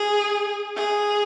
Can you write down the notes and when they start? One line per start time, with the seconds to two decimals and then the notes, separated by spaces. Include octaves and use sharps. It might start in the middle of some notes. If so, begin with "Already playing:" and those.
Already playing: G#4
0.76 G#4